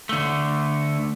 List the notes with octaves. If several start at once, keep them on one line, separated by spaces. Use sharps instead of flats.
D3 A3